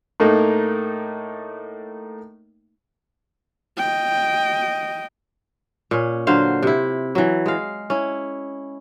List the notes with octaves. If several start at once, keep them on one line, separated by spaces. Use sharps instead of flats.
A2 A3 A#3 D#4
D#5 G5
A#2 C#4
D3 F#3 C5 F5
C3 E4
E3 F#3
G#3 F5
C#4 E4